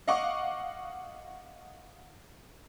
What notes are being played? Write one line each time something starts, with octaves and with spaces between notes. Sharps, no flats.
D#5 F5 F#5 C#6 D6